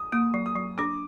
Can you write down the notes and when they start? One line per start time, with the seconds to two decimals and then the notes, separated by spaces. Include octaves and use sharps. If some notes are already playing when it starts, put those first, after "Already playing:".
Already playing: D#6
0.12 A#3 D#6
0.34 F#3
0.46 D#6
0.56 F#3
0.78 D4 D6